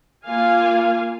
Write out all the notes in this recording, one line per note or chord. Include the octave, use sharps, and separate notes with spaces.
A#3 F4 F5 G#5